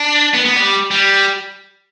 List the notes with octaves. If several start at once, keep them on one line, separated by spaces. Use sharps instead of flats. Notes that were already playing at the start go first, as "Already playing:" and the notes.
Already playing: D4
B3
B3
G3
G3